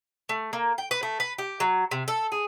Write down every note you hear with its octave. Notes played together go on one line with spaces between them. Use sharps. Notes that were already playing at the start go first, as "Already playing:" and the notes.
A3
A#3
G5
B4
A3
B4
G4
F#3
C3
A4
G#4